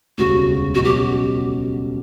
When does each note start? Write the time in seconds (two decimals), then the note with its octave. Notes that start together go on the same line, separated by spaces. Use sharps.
0.18 E1 D2 C#3 G3 F#4
0.75 B1 B2 G3 C#4 F#4
0.85 G4